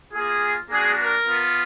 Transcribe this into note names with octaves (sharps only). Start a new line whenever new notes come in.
A#3 F4 G#4
A#3 D4 F#4 G#4
A#4
B3 F4